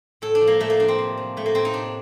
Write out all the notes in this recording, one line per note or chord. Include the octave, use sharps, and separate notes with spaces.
A2 A4
D4
F3
A#3
A2 A3
A#3
F3 D4
C4
C3
F3
A2 A3
A#3
A2 C4
D#4
C3 D4